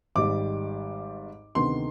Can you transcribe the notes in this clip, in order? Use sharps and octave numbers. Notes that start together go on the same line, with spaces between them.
G#1 G#2 G3 D6
D2 C3 D#3 B3 C6